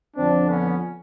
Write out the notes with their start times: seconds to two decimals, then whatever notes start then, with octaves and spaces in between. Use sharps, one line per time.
0.16 F2 D3 F3 C4 D4
0.48 B3 C#4